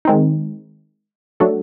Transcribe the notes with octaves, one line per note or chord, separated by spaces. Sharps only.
D#3 G#3 C4 D#4
F#3 A3 D4 F#4 A4